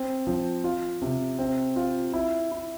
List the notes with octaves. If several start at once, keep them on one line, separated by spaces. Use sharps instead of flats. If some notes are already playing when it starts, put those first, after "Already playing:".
Already playing: C4
F3
F4
C3
C4
F4
E4
E4